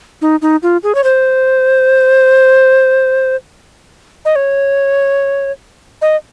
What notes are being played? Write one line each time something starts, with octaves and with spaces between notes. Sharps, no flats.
D#4
D#4
F4
G#4
C#5
C5
D#5
C#5
D#5